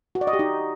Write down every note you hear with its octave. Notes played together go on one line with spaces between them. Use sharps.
F#4
D5
D#5
G4
D#4